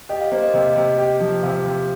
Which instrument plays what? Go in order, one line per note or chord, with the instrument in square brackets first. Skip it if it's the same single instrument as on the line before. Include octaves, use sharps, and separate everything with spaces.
[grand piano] G4 [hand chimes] D#5
[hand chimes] F5
[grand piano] A#3 [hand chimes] C5
[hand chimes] D#5
[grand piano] C3
C3
G4
F3
[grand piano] C3 [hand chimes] F5
[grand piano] C3